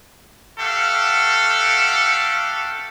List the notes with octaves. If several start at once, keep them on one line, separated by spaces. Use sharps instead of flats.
A3 G4 A4 F5 F#5